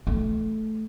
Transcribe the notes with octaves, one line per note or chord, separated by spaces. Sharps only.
A3